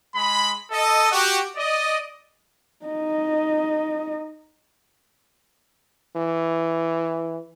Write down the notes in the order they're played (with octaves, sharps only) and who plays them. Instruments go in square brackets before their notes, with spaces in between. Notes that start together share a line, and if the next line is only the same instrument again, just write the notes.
[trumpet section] G#3 B5
A4 D#5
F#4 G4
D5 D#5
[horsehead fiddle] D#4 D#5
[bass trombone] E3